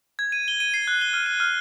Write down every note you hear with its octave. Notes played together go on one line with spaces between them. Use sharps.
G#6
D#7
G7
D#7
C7
F#6
G7
F6
D#7
F6